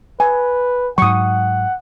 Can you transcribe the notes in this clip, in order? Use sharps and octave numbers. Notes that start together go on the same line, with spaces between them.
B4 G#5
G#2 F#3 F#5 C#6 D#6